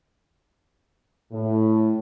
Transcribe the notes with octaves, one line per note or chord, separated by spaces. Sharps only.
A2